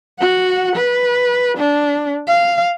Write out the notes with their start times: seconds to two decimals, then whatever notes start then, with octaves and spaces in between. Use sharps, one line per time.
0.19 F#4 F#5
0.76 B4
1.57 D4
2.28 F5